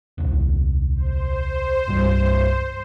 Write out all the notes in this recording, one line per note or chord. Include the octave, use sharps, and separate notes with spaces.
D#1 C2
C5
C2 G2 G3